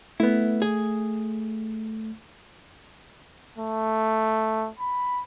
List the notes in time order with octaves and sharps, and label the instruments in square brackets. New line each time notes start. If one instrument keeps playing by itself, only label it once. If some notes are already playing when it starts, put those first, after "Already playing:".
[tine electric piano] A3 [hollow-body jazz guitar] B3 E4
[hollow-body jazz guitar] G#4
[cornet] A3
B5